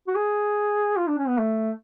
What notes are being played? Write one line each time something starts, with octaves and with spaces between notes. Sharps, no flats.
F#4
G#4
F4
D4
C#4
B3
A3